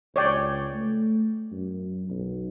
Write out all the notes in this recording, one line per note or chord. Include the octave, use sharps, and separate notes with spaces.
C#2 C#5 D5 G5
A3
F#2
B1